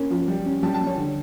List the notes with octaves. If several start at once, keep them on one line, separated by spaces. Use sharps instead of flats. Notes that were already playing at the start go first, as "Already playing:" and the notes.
Already playing: A#3 C#4
F3
G3
C#4
G3 A5
A5
G3
C#5
D3